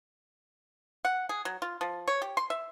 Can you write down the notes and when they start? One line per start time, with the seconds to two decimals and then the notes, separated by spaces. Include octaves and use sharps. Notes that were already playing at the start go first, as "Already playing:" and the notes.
1.05 F#5
1.29 G#4
1.45 F#3
1.62 F4
1.81 F3
2.08 C#5
2.22 G4
2.37 C6
2.50 E5